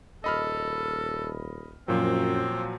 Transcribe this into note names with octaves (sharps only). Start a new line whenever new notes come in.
D#1 A4 D#5 B5 F6
F#2 A#2 F3 F#3 C4